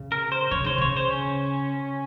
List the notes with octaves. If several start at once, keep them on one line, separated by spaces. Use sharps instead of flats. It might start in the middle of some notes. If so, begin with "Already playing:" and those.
Already playing: C#3
A#4
C5
C#3 C#5
D#3 C5
C#3 C#5
C5
C#4